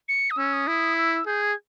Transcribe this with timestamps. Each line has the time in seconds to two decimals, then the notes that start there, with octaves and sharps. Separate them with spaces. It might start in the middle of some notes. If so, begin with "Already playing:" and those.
0.08 C#7
0.31 D#6
0.37 C#4 E6
0.53 D#6
0.68 E4
0.97 E6
1.26 G#4 G6
1.42 G#6